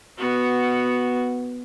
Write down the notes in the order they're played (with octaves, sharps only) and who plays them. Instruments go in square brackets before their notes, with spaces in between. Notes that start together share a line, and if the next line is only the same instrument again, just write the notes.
[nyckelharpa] B3 F#4